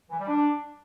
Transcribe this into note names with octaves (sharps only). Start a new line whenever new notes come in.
E3
G3
D4